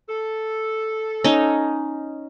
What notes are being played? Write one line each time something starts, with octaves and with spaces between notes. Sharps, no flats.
A4
C#4 D#4